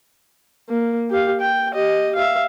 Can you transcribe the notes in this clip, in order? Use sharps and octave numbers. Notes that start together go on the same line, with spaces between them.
A#3
G4 F5
G5
G4 D#5
E5 F5